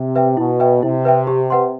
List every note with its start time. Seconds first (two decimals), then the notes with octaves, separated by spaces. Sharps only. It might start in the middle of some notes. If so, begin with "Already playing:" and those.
Already playing: C3
0.15 B4 E5 G5
0.37 B2 E4
0.60 B4 E5 G5
0.83 C3 E4
1.05 B4 E5 G5
1.27 G4
1.50 B4 F#5 C6